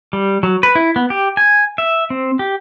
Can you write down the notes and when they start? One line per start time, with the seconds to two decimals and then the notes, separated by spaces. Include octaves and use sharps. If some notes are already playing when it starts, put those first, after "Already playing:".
0.13 G3
0.43 F#3
0.63 B4
0.75 E4
0.96 B3
1.10 G4
1.37 G#5
1.78 E5
2.10 C4
2.39 G4